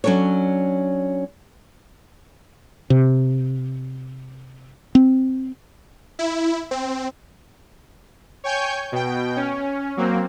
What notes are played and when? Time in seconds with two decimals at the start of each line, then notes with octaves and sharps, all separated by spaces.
0.04 F#3 C#4 D4 A4 C#5
2.90 C3
4.95 C4
6.19 E4
6.71 C4
8.44 C#5 G5 G#5 C#6 G6
8.92 B2 G5
9.36 C#4
9.97 F#3 A#3 C4